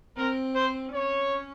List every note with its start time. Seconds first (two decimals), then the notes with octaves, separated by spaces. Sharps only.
0.17 C4 A#4
0.55 C5
0.94 C#4 C#5